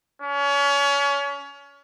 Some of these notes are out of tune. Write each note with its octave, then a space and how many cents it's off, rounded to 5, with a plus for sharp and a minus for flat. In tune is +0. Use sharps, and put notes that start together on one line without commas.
C#4 +30